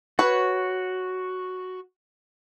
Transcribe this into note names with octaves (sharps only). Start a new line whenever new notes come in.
F#4 B4 C#5